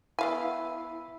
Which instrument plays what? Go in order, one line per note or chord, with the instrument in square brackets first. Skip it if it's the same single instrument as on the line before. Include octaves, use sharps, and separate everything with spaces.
[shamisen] B3 F5 G#5 [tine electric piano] E4 E5